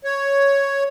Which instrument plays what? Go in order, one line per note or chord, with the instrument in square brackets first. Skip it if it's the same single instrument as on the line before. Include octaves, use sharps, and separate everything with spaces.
[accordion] C#5